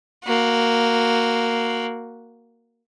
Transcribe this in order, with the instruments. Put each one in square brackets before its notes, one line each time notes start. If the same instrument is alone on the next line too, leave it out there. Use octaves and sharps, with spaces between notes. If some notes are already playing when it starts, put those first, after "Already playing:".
[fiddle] A#3 F#4